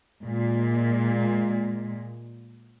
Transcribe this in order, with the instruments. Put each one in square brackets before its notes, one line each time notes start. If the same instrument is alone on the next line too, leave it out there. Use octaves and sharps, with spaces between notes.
[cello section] A#2 G#3